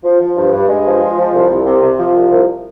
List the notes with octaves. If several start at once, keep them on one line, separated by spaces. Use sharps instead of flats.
F3
F3
G2
G2
G2 G#3
F3
F3
F3
C2
C2
C3
C3
F3
C2
C2